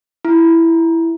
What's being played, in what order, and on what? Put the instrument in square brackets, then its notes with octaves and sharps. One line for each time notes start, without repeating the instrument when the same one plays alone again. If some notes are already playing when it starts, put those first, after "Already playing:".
[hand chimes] E4